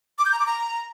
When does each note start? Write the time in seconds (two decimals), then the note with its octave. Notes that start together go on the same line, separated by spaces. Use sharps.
0.18 D6
0.25 G6
0.32 A#5
0.39 D6
0.46 A#5